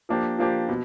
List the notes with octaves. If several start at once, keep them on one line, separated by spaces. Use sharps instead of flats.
F3 A#3 D4 G4
F3 A#3 D4 G4
B2